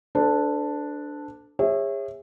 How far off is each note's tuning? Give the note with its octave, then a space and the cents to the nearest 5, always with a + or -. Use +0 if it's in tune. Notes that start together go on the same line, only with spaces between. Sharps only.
D4 +0 A4 +0 C5 -40
G#4 -35 C#5 -20 E5 +0